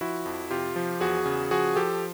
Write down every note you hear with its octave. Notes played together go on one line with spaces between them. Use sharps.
F3 E4 F#4
F2
C3 F4 G4
F3
E2 F#4 G#4
C#3
F3 F#4 G#4
F3 G4 A4